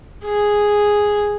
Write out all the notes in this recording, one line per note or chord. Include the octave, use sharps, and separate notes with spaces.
G#4